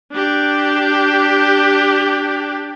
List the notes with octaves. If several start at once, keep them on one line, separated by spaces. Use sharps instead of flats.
D4 G4